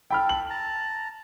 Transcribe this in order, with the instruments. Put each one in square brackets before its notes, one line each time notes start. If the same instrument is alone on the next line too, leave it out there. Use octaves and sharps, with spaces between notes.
[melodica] A4 [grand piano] G5 B5 F6
[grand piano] F#7
[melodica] A5 A#5